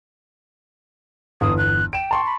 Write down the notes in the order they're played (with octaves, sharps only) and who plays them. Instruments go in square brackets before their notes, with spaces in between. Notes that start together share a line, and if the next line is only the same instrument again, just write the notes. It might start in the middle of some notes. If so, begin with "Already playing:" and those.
[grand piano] G1 E2 [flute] D#6
[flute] F#6
[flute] G5 [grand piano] D7 E7
[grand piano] A5 C6 C#6
[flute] B5